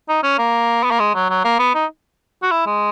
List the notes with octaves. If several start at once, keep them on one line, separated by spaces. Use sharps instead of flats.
D#4
C#4
A#3
B3
A#3
G#3
F#3
F#3
A#3
B3
D#4
F#4
E4
G#3